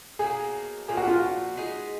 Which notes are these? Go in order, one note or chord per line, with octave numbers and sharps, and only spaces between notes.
B2 F#3 A#3 D#4 G#4
A#2 F3 A#3 G#4
F#4
F4
F#4
G#3 D#4 G#4 B4